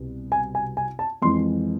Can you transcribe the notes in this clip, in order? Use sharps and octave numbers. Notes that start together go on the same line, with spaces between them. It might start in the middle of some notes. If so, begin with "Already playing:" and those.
Already playing: C2 B2 B3
G#5
G#5
G#5
A5
F2 E3 G#3 C6